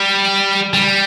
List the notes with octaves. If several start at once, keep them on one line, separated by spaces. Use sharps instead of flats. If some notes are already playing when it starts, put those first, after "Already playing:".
Already playing: G3
G3